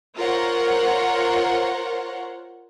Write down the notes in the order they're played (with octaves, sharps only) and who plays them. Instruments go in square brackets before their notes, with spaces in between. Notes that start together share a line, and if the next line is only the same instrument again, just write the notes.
[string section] F4 A#4 C5 C#5 F#5